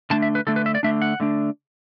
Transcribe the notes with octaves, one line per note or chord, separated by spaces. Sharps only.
D3 A3 D4 A5
E5
B4
D3 A3 D4 A4
B4
E5
D5
D3 A3 D4 E5
F#5
D3 A3 D4